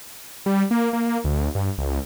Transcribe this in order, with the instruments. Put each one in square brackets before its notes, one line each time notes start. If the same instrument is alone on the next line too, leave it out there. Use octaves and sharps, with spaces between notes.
[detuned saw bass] G3
A#3
A#3
D2
G2
C#2